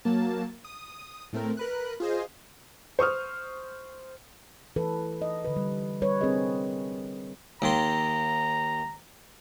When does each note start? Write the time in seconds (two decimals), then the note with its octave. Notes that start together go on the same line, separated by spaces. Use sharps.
0.05 F#3 A#3 A5
0.65 D#6
1.33 A2 A3 C4 A#4
1.57 A#4 B4 F#6
2.00 F4 G#4 C5 D#5
2.99 C5 C#6 D#6 F6
4.76 E3 A4 B4
5.22 D#5
5.45 D3 B4
5.56 G3
6.02 G3 B4 C#5
6.21 C4 D4 G#4 A#4 D#5
7.62 D#2 D#3 A#5 C6